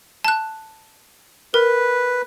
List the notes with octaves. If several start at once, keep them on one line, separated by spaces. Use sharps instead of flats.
A5 F#6
A#4 B4